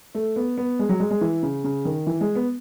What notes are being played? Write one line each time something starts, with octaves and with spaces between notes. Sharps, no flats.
A3
B3
B3
G#3
F#3
G#3
G#3
E3
C#3
C#3
D#3
E3
G#3
B3